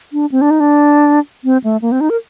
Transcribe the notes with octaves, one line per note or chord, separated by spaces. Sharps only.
D4
C4
D4
D#4
D4
C4
A3
A#3
C4
D#4
A#4